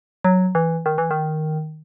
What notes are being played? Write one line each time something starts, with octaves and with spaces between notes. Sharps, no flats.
F#3
E3
D#3
E3
D#3